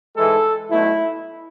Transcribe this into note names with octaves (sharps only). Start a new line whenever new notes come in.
G#2 E3 G#3 A4
B1 B2 A3 E4